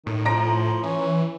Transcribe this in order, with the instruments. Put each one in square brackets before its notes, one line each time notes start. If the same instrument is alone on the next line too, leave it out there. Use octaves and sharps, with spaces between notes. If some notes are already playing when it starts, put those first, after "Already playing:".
[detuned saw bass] A2 [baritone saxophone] D#3
[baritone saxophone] F3 [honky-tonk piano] A#5 A#6 D7
[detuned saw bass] E3 [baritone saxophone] C#4